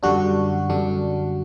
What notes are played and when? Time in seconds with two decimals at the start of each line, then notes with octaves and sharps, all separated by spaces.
0.03 F#2 D3 G3 D4 F#4
0.69 F#2 D3 G3 D4